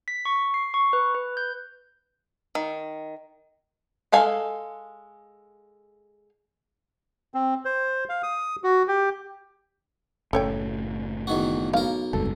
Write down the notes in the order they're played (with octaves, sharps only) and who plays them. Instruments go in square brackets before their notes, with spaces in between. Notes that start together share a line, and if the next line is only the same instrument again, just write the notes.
[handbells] B6
C#6
C7
C#6
B4
B4
G6
[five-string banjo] D#3
G#3 A4 F5 G#5
[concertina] C4
C5
F5
D#6
F#4
G4
[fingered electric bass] F#1 A2 C#4 [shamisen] A4 C#5 G5
[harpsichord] E2 D#3 F#4
[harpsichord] B1 A#4 [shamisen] F5
[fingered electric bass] F1 C#2 G2 [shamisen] A4